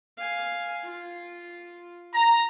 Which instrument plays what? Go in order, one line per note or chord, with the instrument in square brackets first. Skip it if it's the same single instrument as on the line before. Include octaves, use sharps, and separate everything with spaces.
[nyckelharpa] F5 G#5
F4
[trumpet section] A#5